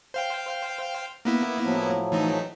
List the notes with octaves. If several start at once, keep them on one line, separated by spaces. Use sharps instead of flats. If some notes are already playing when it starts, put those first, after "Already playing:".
C5 F5 G5
A#3 B3 E4
A2 F3 F#3
E3 A3 D#4